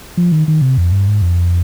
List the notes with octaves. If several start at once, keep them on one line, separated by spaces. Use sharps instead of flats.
F3
D#3
D#3
C3
F2
G2
G#2
F2